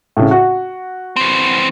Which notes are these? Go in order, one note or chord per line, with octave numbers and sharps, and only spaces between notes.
A2 C#3
F#4
E3 C4